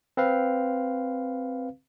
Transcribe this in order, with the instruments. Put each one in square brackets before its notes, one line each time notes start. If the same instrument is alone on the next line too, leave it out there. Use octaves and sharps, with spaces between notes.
[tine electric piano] C4 B4 F5